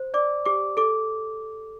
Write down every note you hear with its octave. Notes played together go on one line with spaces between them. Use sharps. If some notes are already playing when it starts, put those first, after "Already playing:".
Already playing: C5
D5 D6
G4 D6
A4 D6